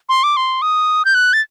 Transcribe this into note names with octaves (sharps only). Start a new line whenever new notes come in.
C6
D6
C6
D#6
G6
F#6
A6